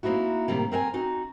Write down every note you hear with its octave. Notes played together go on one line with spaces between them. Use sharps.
A#3 C4 D#4 E4 F#4
A2 C3 D#3 G3 A#3
C4 A#4 F#5 G#5
C4 D#4 F#4